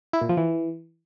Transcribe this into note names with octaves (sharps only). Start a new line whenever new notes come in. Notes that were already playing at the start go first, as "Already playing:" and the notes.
E4
A#2
F3
E3